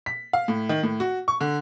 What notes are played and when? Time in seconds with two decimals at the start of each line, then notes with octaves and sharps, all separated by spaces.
0.06 B6
0.33 F5
0.48 A2
0.69 D#3
0.83 A2
1.00 F#4
1.28 C#6
1.41 D3